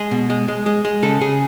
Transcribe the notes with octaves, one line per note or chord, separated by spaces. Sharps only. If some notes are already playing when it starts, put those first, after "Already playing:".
Already playing: G#3 G#4
B2
G#3
G#3
G#3
G#3
C#3 A4
C#3 G#4